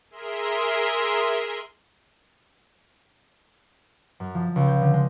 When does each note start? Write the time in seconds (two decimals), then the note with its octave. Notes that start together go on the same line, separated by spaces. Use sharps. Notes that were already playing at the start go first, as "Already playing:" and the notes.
0.10 G#4 A#4 E5 C6
4.20 F#2
4.35 F3
4.56 C#2
4.68 G6
4.81 D3
4.94 G#3